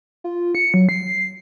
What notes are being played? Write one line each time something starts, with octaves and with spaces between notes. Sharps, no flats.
F4
C#7
F#3
C7